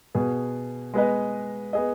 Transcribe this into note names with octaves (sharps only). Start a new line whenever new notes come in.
B2 B3 G#4
G#3 B3 G#4 B4 D#5
B3 G#4 D#5